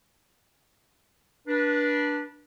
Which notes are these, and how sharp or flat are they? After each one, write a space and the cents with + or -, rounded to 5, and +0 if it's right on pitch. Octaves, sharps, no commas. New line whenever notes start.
D4 +0 B4 -30